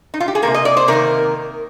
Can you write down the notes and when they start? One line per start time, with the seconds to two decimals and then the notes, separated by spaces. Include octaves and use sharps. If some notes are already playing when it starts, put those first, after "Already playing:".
0.14 D#4
0.20 F4
0.28 G4
0.35 G#4
0.42 D#3 A#3 A#4
0.47 C3
0.54 D#5
0.65 D5
0.77 C5
0.88 C3 D#3 A#3 A#4